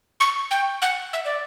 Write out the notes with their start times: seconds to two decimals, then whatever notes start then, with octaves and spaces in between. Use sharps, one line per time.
0.20 C#6
0.51 G5
0.82 F#5
1.13 E5
1.25 D5